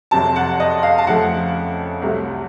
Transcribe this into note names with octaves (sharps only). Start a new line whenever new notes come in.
F#1 F2 C3 F#3 A5
F#5
D#5
F5
A5
F2 C#3 F3 A3 F#5
C2 C3 F#3 A3